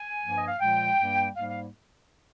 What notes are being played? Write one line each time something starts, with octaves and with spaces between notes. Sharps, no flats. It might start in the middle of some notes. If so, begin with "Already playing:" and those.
Already playing: G#5
G2 F3 A#3
D#5
F5
A#2 F3 G#3 G5
G2 G3 A#3
G#2 G3 A#3 F5
F5